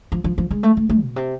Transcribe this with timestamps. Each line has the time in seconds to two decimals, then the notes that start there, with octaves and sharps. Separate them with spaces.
0.12 F3
0.24 F3
0.38 F3
0.51 G#3
0.63 A3
0.77 A3
0.89 A3
1.02 B2
1.16 C3